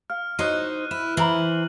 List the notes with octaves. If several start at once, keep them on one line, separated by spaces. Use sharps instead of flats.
F5 F6
D#4 F#4 C5 C#5 D#5 F#6 D#7
E4 E7
E3 C5 E5 A#5 B5 F#7